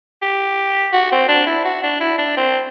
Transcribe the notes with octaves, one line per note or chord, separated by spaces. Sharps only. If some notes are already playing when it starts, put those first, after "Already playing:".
G4
F#4
C4
D4
E4
F#4
D4
E4
D4
C4